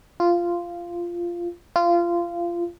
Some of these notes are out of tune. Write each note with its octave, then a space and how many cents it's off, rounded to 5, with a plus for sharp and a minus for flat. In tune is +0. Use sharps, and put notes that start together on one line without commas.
F4 -10
F4 -20